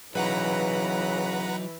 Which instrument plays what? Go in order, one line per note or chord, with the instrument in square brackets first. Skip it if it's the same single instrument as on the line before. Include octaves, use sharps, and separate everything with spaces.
[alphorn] C#3 [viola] E3 [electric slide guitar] F#3 D#4 [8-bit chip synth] B4 F#5 A#5